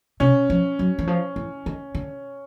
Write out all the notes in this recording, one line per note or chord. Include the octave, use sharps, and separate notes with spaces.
C3 C#4
F3
F#3
E3
F3
E3
D#3
D3